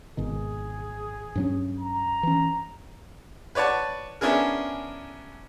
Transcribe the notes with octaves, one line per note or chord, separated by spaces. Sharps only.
G#1 B2 D#3 G#4
G2 F#3 C#4
A#5
E3 C#4
B4 C#5 D5 F#5 A5
B3 C#4 D4 E4 G#4 A#4